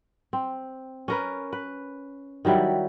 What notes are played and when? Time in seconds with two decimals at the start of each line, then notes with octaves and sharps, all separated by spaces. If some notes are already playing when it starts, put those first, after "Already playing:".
0.33 C4
1.08 C#4 A#4 B4
1.53 B4
2.45 D#3 F#3 G3 E4